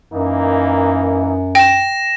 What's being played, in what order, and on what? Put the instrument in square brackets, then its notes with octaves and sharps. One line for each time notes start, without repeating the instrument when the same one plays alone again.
[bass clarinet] F#2 [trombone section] E3 A#3 D#4
[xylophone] G5 [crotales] A#6 E7